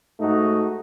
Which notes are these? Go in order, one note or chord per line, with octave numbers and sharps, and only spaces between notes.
G#2 A3 D#4 F#4